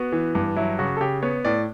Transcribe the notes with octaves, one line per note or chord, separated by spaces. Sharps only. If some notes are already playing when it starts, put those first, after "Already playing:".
Already playing: B3 F#4
E3
G2
F#3 E4
C#3 F#4
A4
C#3 G4
B3 C#5
A2 D5